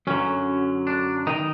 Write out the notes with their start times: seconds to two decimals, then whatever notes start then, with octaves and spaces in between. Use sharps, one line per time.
0.07 F#2 D3 F#3 C#4
0.87 D4
1.27 D#3 D#4